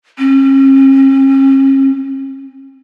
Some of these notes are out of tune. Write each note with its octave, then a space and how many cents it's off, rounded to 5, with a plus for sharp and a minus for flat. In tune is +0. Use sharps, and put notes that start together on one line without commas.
C#4 -45